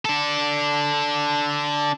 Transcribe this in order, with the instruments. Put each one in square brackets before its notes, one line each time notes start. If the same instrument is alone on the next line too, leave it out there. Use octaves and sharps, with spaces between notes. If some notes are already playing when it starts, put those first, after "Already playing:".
[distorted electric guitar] D4 A4